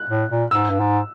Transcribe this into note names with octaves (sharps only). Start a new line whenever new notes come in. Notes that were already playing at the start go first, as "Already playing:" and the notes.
Already playing: F#6
A2
A#2
G#2 E6
G2
G#2